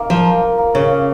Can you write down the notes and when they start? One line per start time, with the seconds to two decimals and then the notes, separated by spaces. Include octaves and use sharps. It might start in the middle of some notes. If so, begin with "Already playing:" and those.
Already playing: A#3 C4 D#4
0.10 F3 F4
0.26 A#4
0.42 A#3
0.58 A#3
0.74 C#3 C#4
0.90 C#4